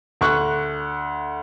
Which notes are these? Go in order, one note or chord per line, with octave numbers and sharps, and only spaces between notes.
D2 C#6 F#6